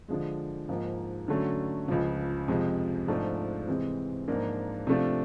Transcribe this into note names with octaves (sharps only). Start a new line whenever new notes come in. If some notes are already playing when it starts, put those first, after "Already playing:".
D3 F3 G#3
G#2 F3 A#3 D#4
D3 F#3 A3 C#4
C#2 C#3 F3
F2 C3 F3 G#3
G#2 F3 A3 D4 F4
C3 E3 G#3 C4
G#2 F3 A#3 D4 F4
C3 F3 A3 D4 F4